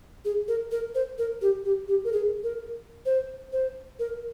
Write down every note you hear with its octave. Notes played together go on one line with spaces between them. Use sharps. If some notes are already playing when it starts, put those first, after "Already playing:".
G#4
A#4
A#4
C5
A#4
G4
G4
G4
A#4
G#4
A#4
C5
C5
A#4